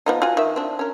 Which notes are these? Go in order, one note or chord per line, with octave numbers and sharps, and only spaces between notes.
F3 B3 D#4
F4 F#4 G#5
D#3 E5
C4 D4
C#4 A#4